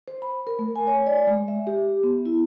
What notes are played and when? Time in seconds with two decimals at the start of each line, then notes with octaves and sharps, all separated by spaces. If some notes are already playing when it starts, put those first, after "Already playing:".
0.08 C5
0.22 B5
0.47 A#4
0.59 A3
0.76 G#5
0.87 C#5
1.07 D5
1.27 G#3
1.48 E5
1.67 G4
2.03 B3
2.26 E4